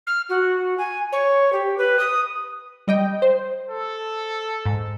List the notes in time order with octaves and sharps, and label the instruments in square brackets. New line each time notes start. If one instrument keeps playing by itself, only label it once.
[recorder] F6
F#4
G#5
C#5
G4
B4
D#6
[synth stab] G3 D#5 G5
C5
[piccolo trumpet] A4
[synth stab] G#2